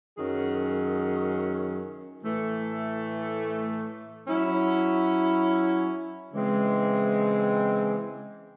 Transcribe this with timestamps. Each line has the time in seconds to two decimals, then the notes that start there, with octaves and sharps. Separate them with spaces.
0.17 F#2 D#3 F#3 C#4 G#4
2.23 A2 E3 A3
4.28 F#3 C#4 E4
6.33 C#3 E3 G#3 C4